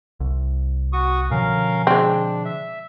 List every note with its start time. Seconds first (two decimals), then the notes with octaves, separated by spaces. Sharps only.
0.20 C2
0.93 F#4 C#6 D#6
1.31 B2 D3 F3 C#4 A#4 F5
1.87 G#3 C4 D4
2.45 E5